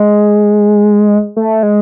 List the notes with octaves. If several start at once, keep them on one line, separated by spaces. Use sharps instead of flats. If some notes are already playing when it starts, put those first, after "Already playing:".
Already playing: G#3
A3
G#3